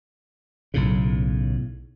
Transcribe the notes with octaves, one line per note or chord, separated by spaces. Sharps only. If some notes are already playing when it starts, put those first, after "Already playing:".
B1 A2 C#3